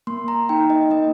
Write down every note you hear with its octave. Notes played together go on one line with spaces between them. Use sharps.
A#3 C6
A#5
D#4 G5
D#5
A#3 D#5